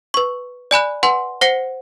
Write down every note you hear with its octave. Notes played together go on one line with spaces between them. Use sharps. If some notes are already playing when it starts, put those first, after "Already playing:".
B4 C#6
D5 G#5 B5 F#6
B4 F#5 G#5 C6
C5 F#5 A#6 C7 C#7